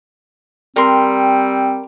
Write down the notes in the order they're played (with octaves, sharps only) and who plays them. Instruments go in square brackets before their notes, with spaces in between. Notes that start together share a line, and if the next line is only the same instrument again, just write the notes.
[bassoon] G3 [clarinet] C4 [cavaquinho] A#4 C6